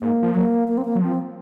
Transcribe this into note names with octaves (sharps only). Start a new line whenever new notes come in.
G#2 A#3
F3
F#3 A#3
A#3
C4
A#3
F#3
F3 C4